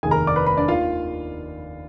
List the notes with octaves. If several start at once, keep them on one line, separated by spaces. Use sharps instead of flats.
F1 D#2 D#3 G#4 G#5
A#4 A#5
D5 D6
B4 B5
B4 B5
D4 D5
D#2 D#3 F4 F5